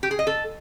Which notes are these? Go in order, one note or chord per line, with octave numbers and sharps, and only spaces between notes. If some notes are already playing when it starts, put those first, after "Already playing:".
G4
G#4
D#5
A4